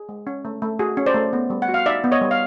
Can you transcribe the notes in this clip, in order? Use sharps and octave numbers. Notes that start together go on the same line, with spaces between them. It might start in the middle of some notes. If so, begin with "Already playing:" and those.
Already playing: G#4
G#3
C#4
A3
A3
F#4 G#4
C#4
C5 D5
A3
B3
G3
F#5
F#4
F5
D#4 D5 E5
B3
C#5 D#5
G3
F5